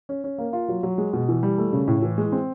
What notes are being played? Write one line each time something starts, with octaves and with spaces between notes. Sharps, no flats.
C#4
C#4
A#3
F4
F#3
F#3
G#3
B2
E3
G3
A3
C#3
A2
E3
G#3
C4